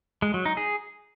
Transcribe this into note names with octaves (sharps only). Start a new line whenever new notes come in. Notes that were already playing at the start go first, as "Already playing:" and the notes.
G#3
F#3
D#4
G#4